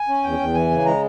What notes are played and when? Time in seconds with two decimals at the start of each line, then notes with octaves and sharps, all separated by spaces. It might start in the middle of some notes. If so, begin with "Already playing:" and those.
Already playing: G#5
0.08 C#4
0.24 E2 G5
0.39 E2
0.54 E3 G#5
0.71 C#3
0.85 G#3 A#5